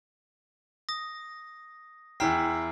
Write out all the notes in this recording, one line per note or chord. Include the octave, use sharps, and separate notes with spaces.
D#6 A#6
E2 E4 G5 A#5 F6 C7